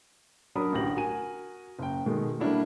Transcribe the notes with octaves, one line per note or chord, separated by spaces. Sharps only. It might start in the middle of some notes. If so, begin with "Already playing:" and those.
F#3 D4 A#4 B5 D#6
A1 D2 D3 G4 A#6 F#7
F#4 A#4 G#5 D#7
F#1 G5
B2 D#3 G#3 A3
G3 A3 A#3 D4 E4 F#4